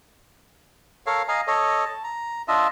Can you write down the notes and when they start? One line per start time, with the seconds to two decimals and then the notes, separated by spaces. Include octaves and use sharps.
1.06 A4 A#4 C#5 F5
1.28 D#5 F5 G#5 A#5
1.47 A4 C#5 D#5
1.85 A5
2.04 A#5
2.48 D4 F4 D#5 E5